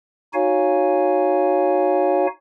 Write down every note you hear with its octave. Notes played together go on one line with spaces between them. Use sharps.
D#4 F#4 C#5 F5 G#5